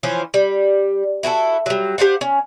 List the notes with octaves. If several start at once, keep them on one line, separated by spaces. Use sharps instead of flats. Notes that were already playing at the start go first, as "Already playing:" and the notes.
E3 F3 C#4 C5
G3
E4 F#4 G4 A4
F#3 G3
G4 C5 F5 F#5
C#4